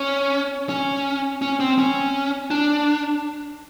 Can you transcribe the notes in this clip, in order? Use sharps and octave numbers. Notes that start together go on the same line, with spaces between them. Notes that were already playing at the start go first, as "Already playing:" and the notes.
Already playing: C#4
C#4
C#4
C4
C#4
D4